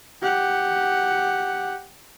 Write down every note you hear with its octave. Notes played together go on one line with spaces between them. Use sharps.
G4 F#5